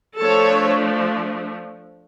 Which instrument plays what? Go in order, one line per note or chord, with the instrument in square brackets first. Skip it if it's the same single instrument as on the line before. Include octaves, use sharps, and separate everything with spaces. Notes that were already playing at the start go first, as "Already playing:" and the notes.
[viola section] F3 A3 D4 A4 C#5